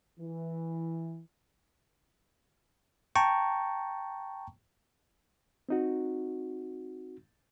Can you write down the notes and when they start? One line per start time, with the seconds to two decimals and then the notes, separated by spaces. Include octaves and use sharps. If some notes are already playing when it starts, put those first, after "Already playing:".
0.19 E3
3.16 G5 A5 A#5 C#6
5.69 C4 D#4 F#4